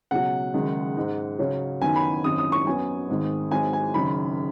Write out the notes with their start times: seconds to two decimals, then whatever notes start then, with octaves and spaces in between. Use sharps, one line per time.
0.11 C#2 B2 F#3 F#5
0.54 F#1 F#2 D#3 G#3 D#4
0.96 G#2 G#3 D#4
1.39 C#2 C#3 F#3 C#4
1.81 F#2 D#3 B3 D#4 G#5
1.96 B5
2.24 G#1 F#2 F#3 D#6
2.38 D#6
2.52 C#6
2.66 F#2 F#3 B3 G#5
3.09 G#1 G#2 D#3
3.51 G#1 G#2 F#3 G#5
3.73 G#5
3.94 F#1 F#2 D#3 B5